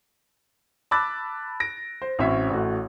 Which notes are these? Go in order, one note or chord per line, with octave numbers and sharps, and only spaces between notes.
A5 B5 D6 E6 F#6 A6
A#6 D7
C5
A1 C4 C#4 F#4 E5 C#6
A1 A3 F#4